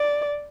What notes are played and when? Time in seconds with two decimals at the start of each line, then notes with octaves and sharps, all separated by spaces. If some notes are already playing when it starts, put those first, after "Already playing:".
Already playing: D5